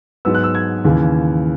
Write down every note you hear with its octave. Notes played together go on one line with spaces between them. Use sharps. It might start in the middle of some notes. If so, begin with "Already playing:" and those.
G#2 F#3 B3 E6
F#6
E6
G#6
D#2 C#3 E3